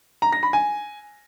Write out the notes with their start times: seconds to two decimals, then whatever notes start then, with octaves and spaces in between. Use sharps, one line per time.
0.22 A#5
0.32 A#6
0.43 B5
0.53 G#5